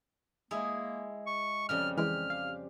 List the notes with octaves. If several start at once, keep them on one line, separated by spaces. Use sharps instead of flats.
G#3 A#3 E4 G#4
C#6
F2 C#3 G3 F6
E3 G#3 G4 F6
F5